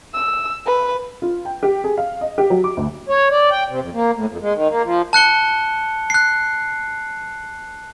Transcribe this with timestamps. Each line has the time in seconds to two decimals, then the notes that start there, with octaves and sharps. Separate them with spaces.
0.14 E6
0.66 B4
1.22 F4
1.45 G5
1.63 G4
1.84 G#4
1.98 F5
2.21 D#5
2.38 G4
2.50 F#3
2.64 D6
2.77 D2
3.09 C#5
3.31 D5
3.51 G5
3.68 C3
3.80 F2
3.93 A#3
4.13 A2
4.29 F2
4.41 G#3
4.53 D#3
4.69 A#3
4.83 F3
5.13 A5 F#6 C#7 G7
6.10 F#6 C7